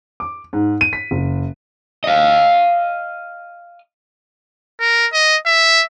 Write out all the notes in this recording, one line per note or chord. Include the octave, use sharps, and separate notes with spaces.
D6
G#2
D#7
B6
F#1
D#5 F5
A#4
D#5
E5